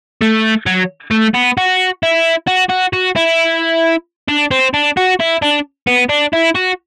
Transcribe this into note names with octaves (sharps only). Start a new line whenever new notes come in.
A3
F#3
A3
B3
F#4
E4
F#4
F#4
F#4
E4
D4
C4
D4
F#4
E4
D4
B3
D4
E4
F#4